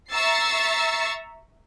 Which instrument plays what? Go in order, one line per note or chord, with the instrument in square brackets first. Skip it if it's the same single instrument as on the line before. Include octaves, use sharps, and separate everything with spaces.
[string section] E5 A#5 C#6 E6 A6 C7